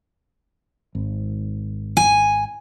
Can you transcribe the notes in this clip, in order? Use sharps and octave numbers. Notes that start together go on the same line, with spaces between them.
G#1
G#5